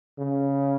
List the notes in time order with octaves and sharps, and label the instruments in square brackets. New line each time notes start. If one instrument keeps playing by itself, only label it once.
[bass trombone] C#3